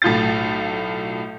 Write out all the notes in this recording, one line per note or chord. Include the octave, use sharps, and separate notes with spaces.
B1 A2 F4 G6 A6